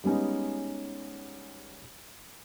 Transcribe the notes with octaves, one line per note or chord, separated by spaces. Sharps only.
G3 G#3 B3 C#4 D#4